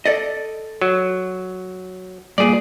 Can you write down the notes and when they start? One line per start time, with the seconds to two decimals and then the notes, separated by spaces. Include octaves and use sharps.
0.05 A4 D5 D#5
0.81 F#3
2.38 G2 A#2 G#4 D5